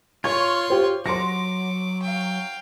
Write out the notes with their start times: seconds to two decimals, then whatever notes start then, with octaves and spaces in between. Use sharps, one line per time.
0.24 F4 C#5 C6 C#6 G#6
0.70 G4 C5
1.06 F#3 C6 D6 A#6
2.02 F5 G5